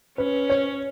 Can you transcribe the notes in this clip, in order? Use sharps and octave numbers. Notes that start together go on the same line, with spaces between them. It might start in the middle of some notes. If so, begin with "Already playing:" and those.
C#4 B4
C#5